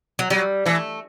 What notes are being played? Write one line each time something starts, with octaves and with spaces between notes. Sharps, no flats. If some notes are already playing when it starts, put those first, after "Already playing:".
F#3
F#3 G3
E3 A3